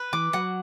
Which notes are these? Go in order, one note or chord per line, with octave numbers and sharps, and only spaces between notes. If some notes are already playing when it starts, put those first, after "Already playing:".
Already playing: B4
E3 D6
F#3 F#5